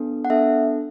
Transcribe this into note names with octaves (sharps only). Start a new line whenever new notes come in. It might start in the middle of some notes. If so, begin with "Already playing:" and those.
Already playing: B3 D4 A4
F#5
B3 D4 A4 E5